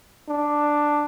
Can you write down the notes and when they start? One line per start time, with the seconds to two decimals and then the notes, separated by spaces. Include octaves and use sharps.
0.28 D4